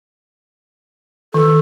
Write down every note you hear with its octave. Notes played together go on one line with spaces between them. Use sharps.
D#3 A4